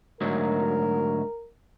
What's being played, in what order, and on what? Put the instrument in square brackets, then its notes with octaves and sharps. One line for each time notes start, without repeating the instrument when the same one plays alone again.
[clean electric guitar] D2 G#2 F#3 [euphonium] A#4